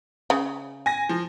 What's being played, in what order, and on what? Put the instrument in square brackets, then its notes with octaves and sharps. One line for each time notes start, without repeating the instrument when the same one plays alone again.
[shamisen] C#3
[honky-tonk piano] G#5 A#6
F3